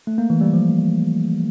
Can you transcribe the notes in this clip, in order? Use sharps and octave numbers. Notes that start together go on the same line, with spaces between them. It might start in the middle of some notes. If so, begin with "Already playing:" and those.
A3
A#3
E3
G3
F3